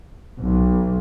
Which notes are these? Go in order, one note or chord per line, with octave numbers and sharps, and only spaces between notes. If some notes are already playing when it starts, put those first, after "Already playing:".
B1